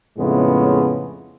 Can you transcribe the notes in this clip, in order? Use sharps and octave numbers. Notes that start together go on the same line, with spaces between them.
F2 A2 C#3 G#3 A3 B3